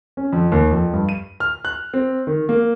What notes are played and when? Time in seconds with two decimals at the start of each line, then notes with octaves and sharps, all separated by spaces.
0.17 C#4
0.33 F2
0.52 D#2
0.71 F2
0.93 G2
1.09 D#7
1.40 F6
1.65 F#6
1.94 C4
2.27 D#3
2.49 A#3